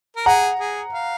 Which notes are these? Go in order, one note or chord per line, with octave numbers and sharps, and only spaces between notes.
A#4
G#4 F#5 A#5
G#4
F5